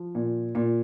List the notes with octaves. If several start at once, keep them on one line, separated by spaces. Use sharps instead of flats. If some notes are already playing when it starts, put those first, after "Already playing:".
Already playing: F3
A#2
A#2